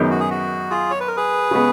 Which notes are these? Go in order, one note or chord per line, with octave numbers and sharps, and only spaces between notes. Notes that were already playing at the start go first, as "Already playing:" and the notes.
Already playing: F#2 D#3 G#3 B3 D#4
F#4
G#4
F#4
F4 G#4
C#5
B4
A#4
G#4 B4
C#3 G#3 B3